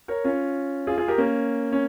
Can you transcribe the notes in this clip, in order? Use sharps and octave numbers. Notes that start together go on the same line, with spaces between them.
A#4 C#5
C#4 F4
F4 G#4
F4 G#4
G4 A#4
A#3 C#4
C#4